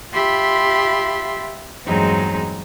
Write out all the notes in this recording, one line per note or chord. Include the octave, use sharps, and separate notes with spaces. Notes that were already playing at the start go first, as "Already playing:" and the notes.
F4 G4 E5 B5 C6
E2 G2 F#3 G#3 C4 D#4